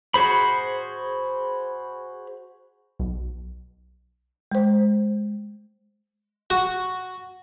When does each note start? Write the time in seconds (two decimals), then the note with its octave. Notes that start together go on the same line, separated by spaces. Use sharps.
0.14 F#4 G#4 C5 B5
3.00 B1
4.52 G#3 C5
6.50 F#4